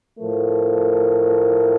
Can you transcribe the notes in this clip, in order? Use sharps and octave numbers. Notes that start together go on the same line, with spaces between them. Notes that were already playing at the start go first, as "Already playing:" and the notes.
A2 F3 A3 A#4